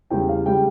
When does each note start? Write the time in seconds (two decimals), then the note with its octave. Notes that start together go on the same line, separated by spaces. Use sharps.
0.10 E2 C#3 G3 G5
0.29 F5
0.46 C#3 G3 G5